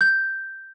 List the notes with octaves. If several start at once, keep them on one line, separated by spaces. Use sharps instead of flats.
G6